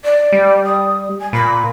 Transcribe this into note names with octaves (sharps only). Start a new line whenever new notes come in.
D5
G3
D#6
G#5
A#2 B5